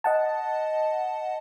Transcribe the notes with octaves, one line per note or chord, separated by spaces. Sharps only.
D#5 F#5 A5